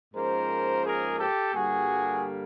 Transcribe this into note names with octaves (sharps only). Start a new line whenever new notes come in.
G#2 F3 A#3 C#4 A#4 C5
G#4 A#4
G4 A4
G2 D3 G3 A#3 F#4 G#4